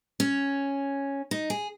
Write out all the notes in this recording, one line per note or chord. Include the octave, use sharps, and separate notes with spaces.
C#4
D#4
G#4